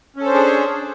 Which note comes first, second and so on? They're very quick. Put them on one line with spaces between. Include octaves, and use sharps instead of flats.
C#4 A4 C5 D4 G#4